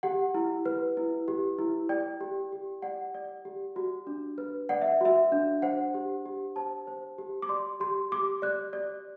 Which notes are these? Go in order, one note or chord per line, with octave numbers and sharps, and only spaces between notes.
G4 F#5
E4
B4
E4
G4
E4
D5 G5
G4
G4
D5 F#5
D5
G4
F#4
D4
B4
D5 F#5
E5
F#4 E5
D4
C5 F#5
G4
G4
C5 A5
C5
G4
D6
D5 C6
G4 C6
G4 D6
D5 F#6
D5